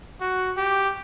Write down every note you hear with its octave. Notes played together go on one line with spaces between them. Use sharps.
F#4
G4